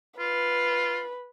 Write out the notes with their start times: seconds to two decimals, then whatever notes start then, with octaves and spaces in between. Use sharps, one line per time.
0.19 F4 B4